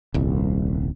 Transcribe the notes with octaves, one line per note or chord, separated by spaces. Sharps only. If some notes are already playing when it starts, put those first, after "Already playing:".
D#1 C2